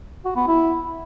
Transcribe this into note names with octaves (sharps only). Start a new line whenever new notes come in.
F#4
B3
E4